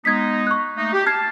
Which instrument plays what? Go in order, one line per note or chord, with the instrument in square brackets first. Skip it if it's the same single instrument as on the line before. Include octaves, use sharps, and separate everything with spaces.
[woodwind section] G#3 B3 D#4 [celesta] G#6 B6
[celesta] C#6 F#6
[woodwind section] A3 A#3 D#4
G4
[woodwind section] A5 [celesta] F6 G#6 C7